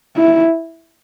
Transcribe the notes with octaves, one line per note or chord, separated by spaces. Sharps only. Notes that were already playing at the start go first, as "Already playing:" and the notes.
E4